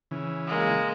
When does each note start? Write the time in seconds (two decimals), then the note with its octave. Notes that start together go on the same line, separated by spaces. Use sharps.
0.11 C#3 E3
0.48 G#3 A#3